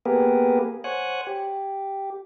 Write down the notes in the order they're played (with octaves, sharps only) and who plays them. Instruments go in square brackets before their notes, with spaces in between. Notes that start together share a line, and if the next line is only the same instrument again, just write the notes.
[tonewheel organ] A#3 B3 G4 G#4 A#4 B4
C5 C#5 F#5 G#5 F#6
G4